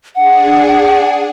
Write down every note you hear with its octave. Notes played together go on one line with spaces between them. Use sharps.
D4 G#4 F#5